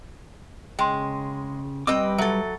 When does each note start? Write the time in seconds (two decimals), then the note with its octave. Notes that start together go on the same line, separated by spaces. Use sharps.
0.79 C#3 G#3 G5 C6
1.87 G3 C4 B4 D#5 G5 D6
2.18 F#3 A4 E5